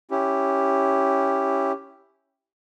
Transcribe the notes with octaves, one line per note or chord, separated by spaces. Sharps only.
C#4 E4 G4